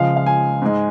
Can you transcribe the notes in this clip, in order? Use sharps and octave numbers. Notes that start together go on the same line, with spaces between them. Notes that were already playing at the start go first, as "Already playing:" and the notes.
Already playing: C#2 C#3 F3 G#3 F5
F5
G#5
G#2 G#3